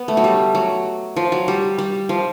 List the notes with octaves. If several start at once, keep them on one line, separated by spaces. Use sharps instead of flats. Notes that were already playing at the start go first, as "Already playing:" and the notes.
Already playing: B3
A3
F#3
G3
F#3
F3
F#3
G3
G3
F3